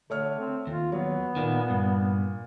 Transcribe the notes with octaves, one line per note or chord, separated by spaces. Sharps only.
D3 A3 C#5 F6
C4
D#2 F4
F#3 B3 C#5
A#2 D#3 D#4
G2